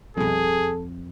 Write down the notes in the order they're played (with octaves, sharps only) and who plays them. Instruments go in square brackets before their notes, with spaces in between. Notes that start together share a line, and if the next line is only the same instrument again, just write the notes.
[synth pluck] C2 B2 [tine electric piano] F2 [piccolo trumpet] G#4 [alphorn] A4